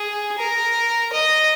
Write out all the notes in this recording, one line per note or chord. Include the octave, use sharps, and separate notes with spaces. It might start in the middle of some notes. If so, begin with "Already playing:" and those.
Already playing: G#4
A#4
D#5